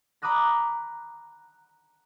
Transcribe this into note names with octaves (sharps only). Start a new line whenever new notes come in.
A#5 B5 D6 D#6 F#6 A#6